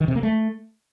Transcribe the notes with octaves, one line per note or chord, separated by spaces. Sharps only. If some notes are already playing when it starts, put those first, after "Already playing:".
D#3
C3
A#3
A3